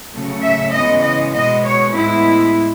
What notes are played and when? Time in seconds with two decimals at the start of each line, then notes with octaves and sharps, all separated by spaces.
0.12 C#3 F#3 A3
0.43 E5
0.72 C#3 E3 G#3 B3 D#5
1.03 D#5
1.33 B2 G#3 B3 D#5
1.65 C#5
1.95 A2 G#3 B3 E4